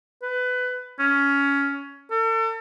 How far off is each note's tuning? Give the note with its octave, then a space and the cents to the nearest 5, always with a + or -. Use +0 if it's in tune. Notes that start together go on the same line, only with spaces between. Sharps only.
B4 +20
C#4 +15
A4 +40